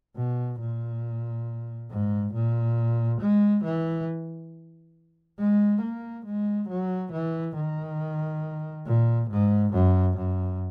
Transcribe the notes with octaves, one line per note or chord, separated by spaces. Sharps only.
B2
A#2
G#2
A#2
G#3
E3
G#3
A#3
G#3
F#3
E3
D#3
A#2
G#2
F#2
F#2